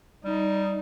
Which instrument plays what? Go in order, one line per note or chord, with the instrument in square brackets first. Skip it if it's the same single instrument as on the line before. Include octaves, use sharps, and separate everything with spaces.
[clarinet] G3 [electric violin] D#4